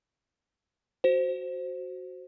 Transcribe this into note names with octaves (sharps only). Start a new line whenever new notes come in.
F#4 C5